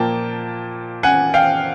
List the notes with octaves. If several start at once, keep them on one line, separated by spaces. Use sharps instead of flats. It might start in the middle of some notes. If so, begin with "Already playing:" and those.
Already playing: A#2 F3 A#3 G5 A5
F#5 G#5
F5 G5